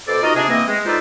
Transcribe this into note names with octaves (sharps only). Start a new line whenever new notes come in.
B2 A4 C5 D5
D#4 F4 F#4 A#4 D#5
C3 D4 G#4
E3 A#3 C4 D#5
G#3
D#4 F4 A4 B4 C5 D5